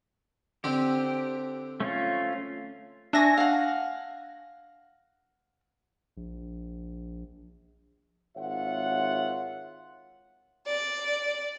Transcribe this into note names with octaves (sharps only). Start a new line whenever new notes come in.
D3 C4 D4 G4
A3 C#4 F4
D4 E5 G#5 C#6 A#6
F5 F#5
A#1
G#1 F4 C#5 E5 F#5
D5